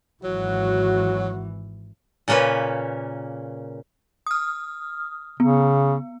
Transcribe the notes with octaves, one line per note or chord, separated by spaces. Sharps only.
G#1 E3 F#3 F#4
A#2 C#3 A#3 C#4 B4
D#6 F6
C#3 B3